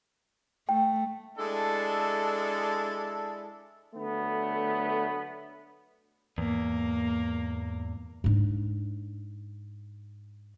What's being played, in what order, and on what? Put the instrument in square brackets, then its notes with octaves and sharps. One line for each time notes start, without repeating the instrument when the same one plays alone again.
[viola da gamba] A3 [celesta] G5
[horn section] G#3 D4 E4 A4
[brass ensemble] D3 F#3 A3 B3
[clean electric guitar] E2 [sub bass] G#2 [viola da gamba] A#3
[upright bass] G#2 D4